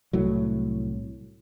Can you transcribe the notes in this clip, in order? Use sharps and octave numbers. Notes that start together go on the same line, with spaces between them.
C2 A2 F#3